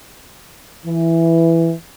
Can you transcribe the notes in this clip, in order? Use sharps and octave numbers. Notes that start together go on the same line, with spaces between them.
E3